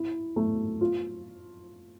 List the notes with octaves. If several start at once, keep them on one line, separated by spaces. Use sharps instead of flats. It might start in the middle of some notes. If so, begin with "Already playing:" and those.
Already playing: E4
A3
F4